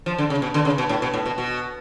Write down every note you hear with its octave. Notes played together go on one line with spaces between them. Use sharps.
F3
D3
C#3
B2
D3
C#3
B2
A2
B2
A2
B2
B2